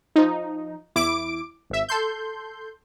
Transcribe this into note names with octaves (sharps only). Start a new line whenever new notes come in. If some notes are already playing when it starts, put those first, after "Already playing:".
F3 D#4
E2 E4 D6 D7
G#1 E5
A4 C6 G6